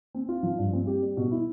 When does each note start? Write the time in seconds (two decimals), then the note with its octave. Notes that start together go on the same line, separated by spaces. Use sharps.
0.14 C4
0.29 F4
0.43 F3
0.59 G2
0.73 C4
0.87 G4
1.02 G3
1.17 B2
1.32 E4